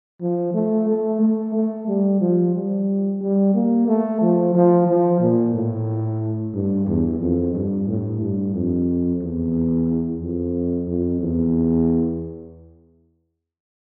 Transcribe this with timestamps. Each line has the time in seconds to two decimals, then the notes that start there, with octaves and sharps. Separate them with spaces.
0.22 F3
0.54 A3
0.89 A3
1.21 A3
1.55 A3
1.88 G3
2.21 F3
2.55 G3
3.21 G3
3.55 A#3
3.88 A3
4.22 F3
4.55 F3
4.88 F3
5.21 A#2
5.54 A2
6.54 G2
6.87 E2
7.21 F2
7.55 G2
7.88 A2
8.21 G2
8.55 F2
9.22 E2
10.21 F2
10.88 F2
11.21 E2